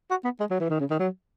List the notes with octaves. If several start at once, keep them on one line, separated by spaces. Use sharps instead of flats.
F#4
B3
G#3
F#3
E3
D#3
C#3
D#3
F#3